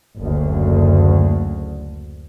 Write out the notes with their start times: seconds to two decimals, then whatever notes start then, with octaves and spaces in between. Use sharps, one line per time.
0.18 F#1 D2